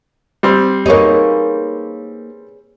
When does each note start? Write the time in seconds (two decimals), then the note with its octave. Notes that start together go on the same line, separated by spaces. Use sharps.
0.43 G3 C4
0.86 A#3 D#4 G#4 B4 C#5